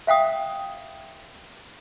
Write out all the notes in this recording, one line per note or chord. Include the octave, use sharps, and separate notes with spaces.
E5 F5 G5 D#6